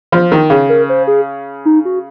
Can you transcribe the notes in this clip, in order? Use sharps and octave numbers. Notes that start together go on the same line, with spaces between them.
F3
D#3
C#3
A#4
C5
G#4
D#4
F#4